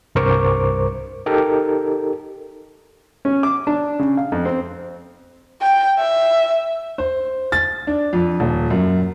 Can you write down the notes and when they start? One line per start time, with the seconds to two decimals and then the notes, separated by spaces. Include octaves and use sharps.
0.15 C2 G2 A#4 C5 C#6 D6
1.26 D#4 G4 A4 A#4
3.25 C#4
3.43 D6
3.67 D4
3.99 C#3
4.17 F5
4.32 F2
4.45 C4
5.62 G5
5.99 E5
6.98 C5
7.52 A6
7.87 D4
8.13 F2
8.40 D#1
8.70 F#2